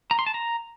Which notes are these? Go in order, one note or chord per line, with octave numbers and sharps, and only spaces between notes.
A#5
C6
A5
A#5